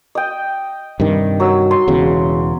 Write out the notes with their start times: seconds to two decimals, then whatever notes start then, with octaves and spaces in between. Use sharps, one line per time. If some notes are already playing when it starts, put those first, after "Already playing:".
0.15 D#5 G5
1.00 G2 C3 D#3
1.40 F#3 E6
1.71 C6
1.88 E1 E2 C#3